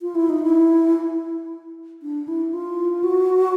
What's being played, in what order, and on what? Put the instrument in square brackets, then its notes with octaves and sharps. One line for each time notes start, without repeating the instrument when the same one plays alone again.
[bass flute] F4
E4
D#4
E4
D4
E4
F4
F#4